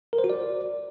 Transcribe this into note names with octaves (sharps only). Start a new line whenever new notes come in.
A#4
C5
F#4
D5